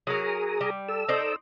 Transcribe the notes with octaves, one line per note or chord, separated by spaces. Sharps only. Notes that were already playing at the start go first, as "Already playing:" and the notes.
F#3 G#4 A#4 A#5 D#6
G3
A4 E6
D#4 C5 D5